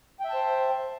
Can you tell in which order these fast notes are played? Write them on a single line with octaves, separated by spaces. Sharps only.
G5 E5 A5 C5